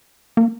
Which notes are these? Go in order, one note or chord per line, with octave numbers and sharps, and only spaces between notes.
A#3